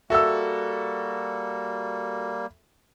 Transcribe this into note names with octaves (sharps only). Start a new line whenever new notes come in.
G3 A#3 F#4 A4 E5 E6